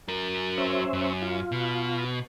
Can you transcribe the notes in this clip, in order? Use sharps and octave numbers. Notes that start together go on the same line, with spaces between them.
F#3 A#4
C#4 C5 E5
F#2
F4
B2